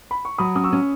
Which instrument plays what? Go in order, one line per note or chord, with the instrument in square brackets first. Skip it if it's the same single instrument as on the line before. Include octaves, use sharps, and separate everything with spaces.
[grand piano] B5
C#6
[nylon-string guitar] F#3 [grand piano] B5 D#6
[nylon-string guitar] C#4 [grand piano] D#6
[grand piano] C#6 E6
[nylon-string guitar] C#4